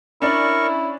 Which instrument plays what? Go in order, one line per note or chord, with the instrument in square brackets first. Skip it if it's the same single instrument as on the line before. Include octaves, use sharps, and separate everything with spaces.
[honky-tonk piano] C#4 D4 D5 [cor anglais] E4 [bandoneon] A#4 C#6